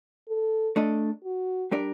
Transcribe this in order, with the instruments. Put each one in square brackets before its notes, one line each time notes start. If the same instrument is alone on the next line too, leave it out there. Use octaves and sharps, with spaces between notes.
[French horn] A4
[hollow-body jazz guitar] A3 D4 A4 D#5
[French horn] F#4
[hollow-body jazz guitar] G3 D4 G4 A#4 D5